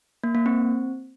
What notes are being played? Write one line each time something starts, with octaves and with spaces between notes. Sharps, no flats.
A#3
A#3
C4